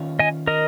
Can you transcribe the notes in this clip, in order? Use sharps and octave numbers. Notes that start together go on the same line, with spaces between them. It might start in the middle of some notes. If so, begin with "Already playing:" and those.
Already playing: D#3 C#4 F4
D#5 G#5
A#4 D#5